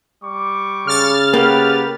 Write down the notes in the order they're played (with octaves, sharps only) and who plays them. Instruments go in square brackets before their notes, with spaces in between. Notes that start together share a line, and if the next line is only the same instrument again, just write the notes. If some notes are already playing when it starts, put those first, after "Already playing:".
[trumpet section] G3 C#6 D6
[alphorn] C#3 [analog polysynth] F6 A6
[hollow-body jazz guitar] A#3 [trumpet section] G4 B4 F#5